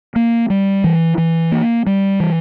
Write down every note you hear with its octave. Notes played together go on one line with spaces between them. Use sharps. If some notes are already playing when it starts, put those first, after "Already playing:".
A#3
G3
E3
E3
A#3
G3
E3